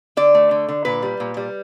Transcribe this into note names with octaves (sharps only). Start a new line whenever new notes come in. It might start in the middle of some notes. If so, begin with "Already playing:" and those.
D3 D5
A3
D3
D3
A#2 B4
G3
A#2
G3